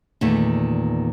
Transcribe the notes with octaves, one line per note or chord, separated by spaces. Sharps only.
E2 A#2 D#3 A3